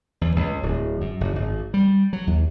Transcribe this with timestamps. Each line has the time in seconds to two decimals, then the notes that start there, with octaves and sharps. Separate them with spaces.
0.21 E2
0.36 C#2
0.63 D1
1.01 F#2
1.21 F#1
1.36 G#1
1.74 G3
2.13 F#3
2.27 D#2